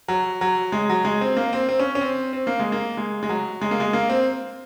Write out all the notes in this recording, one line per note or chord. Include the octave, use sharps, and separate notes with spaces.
F#3
F#3
G#3
F#3
G#3
C4
A#3
C4
C4
C#4
C#4
C4
C4
A#3
G#3
A#3
G#3
G#3
F#3
G#3
A#3
G#3
A#3
C4